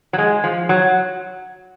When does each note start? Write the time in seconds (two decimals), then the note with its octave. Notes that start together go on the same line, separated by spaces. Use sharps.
0.13 F#3
0.18 G#3
0.44 F3
0.69 F#3